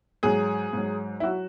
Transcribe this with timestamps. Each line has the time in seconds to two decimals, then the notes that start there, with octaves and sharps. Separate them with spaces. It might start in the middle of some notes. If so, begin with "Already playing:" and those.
0.23 G#2 F#3 G#4
0.73 G#2 F#3
1.20 E4
1.23 F#3 F#4